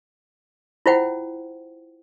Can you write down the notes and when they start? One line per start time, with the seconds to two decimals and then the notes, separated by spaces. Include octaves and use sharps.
0.86 E4 F4 C5 F#5 G5